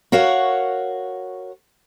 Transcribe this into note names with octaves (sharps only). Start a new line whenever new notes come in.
F#4 A#4 C#5 F5 F#5